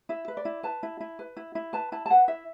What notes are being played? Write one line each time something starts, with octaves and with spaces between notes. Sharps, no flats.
E4 E5
B4
D5
E4
B4 A5
E4
E4
B4
E4
E4
B4 A5
E4 A5
A5
B4 F#5
E4 E5